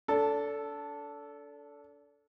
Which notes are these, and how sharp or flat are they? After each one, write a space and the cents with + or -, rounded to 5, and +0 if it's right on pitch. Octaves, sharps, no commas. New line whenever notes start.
D4 -30 A4 +0